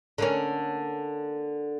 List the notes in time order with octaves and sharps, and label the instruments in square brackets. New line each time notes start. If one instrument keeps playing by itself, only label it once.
[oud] D3 A#3 C#4